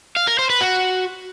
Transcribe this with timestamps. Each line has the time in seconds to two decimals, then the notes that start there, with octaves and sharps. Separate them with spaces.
0.16 F5
0.28 A#4
0.39 C5
0.50 B4
0.61 F#4